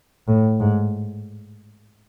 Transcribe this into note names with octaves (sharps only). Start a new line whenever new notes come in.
A2
G#2